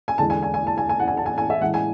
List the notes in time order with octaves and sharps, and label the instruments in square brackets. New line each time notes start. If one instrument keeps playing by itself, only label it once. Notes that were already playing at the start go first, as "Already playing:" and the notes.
[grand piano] G#5
E2 D3 G#3 A5
G#5
G#5
G#5
A5
G#5
G#5
F#5
G#5
A5
G#5
G#5
E5
A2 E3 G#3 F#5
G#5